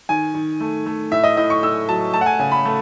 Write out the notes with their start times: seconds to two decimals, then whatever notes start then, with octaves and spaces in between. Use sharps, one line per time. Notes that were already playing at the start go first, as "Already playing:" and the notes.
0.09 D#3 G#5
0.34 D#3
0.60 A3
0.86 A3
1.11 A2 E5
1.24 D#5
1.37 A2 D#5
1.50 C#6
1.63 A2 E6
1.88 F#3 A5
2.13 A3 A5
2.21 F#5
2.26 G#5
2.39 C#3 G#5
2.52 B5
2.65 A3